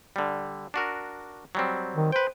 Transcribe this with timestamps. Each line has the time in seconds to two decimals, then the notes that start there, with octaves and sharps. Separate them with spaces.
0.16 D3 G3
0.74 D4 F#4 A#4
1.55 F#3 G3 C4
1.96 D#3
2.12 B4 C5 G5